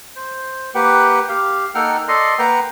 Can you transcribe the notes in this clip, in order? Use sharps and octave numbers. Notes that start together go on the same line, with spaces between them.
C5
A#3 G4 B4 F#5 G5
G4 F5
A#3 D#4 A4 F#5 G5 F6
A4 D5 D#5 C6
A#3 B4 F#5 G5 A#5